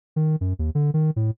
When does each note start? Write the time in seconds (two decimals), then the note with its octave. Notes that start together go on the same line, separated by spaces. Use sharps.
0.16 D#3
0.41 F#2
0.59 D#2
0.75 D3
0.94 D#3
1.16 A2